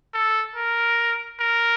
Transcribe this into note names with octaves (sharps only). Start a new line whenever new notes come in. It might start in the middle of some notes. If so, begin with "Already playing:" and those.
A4
A#4
A#4